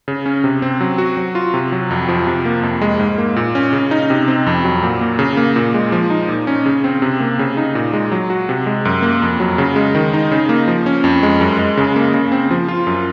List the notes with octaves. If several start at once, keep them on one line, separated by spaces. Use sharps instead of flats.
C#3
C#4
C3
C4
F#3
F#4
F#3
F4
C3
F#3
F2
F3
C3
A#3
F2
G#3
G#2
A#3
A#2
C#4
C#3
D#4
C3
C4
F2
F#3
A#2
A#3
C#3
A#3
A#2
G#3
F3
D#4
A#2
C#4
C#3
C4
C3
A#3
C#3
D#4
A#2
G#3
F#3
F#4
C3
G#3
F#2
A#3
F2
F#3
C#3
G#3
D#3
D#4
C#3
A#3
F3
C#4
F2
G#3
F#2
G#3
C#3
A#3
C#3
C4
F3
F4
F#2